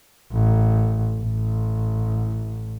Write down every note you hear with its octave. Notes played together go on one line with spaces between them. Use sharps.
A1
A1